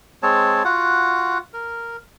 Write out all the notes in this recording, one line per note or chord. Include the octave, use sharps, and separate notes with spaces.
G#3 C4 C#5 A5
F4 F#4 F#5
A#4